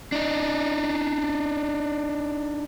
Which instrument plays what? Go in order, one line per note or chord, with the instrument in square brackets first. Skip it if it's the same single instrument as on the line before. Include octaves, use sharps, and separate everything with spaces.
[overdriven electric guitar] D4 D#4